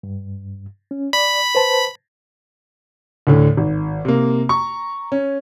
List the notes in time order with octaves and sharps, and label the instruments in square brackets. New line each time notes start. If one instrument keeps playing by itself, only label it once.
[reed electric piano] G2
C#4
[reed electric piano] D5 [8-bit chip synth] B5
[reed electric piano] B4 C5 A5
[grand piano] D2 A2 D3
G#1
C3 A#3
A#5 C#6
C#4